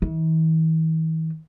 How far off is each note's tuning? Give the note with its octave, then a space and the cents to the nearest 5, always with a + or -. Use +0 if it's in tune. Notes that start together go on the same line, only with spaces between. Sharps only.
E3 -45